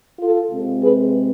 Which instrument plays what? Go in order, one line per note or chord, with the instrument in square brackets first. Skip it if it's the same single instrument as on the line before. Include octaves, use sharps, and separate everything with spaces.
[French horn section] F4 A4
C3 G#3 C4
G#4 B4